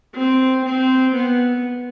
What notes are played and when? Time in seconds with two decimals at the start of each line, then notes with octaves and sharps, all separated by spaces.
0.15 C4
0.65 C4
1.15 B3